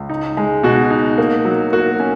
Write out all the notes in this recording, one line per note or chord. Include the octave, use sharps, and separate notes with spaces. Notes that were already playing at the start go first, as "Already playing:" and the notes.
Already playing: C#2
D#4
G#3
B2 F#4
D#4
A#3
F#3
A#3 F#4
C#4